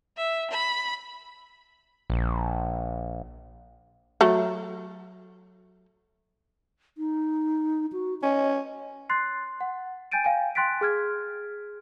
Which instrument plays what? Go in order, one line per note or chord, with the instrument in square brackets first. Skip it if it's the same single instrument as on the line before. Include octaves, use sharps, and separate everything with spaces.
[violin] E5
B5
[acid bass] A#1
[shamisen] F#3 A3
[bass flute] D#4
F#4
[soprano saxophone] C#4 [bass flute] D#5
[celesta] C6 F#6 A6 C7
F#5
G5 G#5 G6 A6 D7 D#7
F5 G5 G#5
G5 C6 F#6 A6 B6 D7
G#4 F6 G#6